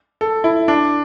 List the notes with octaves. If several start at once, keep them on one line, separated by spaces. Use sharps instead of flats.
A4
E4
D4